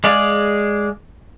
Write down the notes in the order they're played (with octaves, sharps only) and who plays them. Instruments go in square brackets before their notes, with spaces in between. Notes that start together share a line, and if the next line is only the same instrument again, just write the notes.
[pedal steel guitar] G#3 G#4 D5 F5